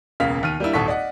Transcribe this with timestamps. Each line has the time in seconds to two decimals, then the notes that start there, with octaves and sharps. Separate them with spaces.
0.20 E1 C#2 C#3 A#3 F5 B6
0.43 D#2 F6 D#7
0.60 G3 A#3 D4 E4
0.73 D#1 G#1 A4 F#5 C#6 B6
0.88 D5 D#5 F#5